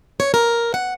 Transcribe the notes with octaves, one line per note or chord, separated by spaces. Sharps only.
C#5
A#4
F#5